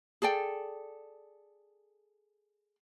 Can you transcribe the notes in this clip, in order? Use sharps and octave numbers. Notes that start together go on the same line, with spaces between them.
G#4 A4 D5 G5